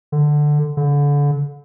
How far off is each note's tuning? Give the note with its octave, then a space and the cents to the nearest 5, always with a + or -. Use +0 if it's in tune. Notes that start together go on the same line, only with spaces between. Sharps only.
D3 +10
D3 -30